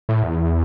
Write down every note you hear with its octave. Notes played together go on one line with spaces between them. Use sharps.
A2
E2